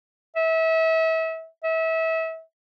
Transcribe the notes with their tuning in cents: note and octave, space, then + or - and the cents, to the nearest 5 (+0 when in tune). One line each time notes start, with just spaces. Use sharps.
E5 -30
E5 -30